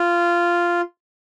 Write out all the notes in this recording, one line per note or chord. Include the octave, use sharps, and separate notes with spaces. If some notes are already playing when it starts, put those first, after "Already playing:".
Already playing: F4